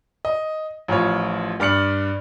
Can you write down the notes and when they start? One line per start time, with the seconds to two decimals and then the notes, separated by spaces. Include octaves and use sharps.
0.25 D#5
0.88 A1 F3 F4 C#5
1.60 G2 D5 F6 C#7 F#7